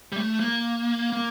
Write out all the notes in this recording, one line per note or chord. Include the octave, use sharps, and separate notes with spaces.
G3
A3
A#3
A#3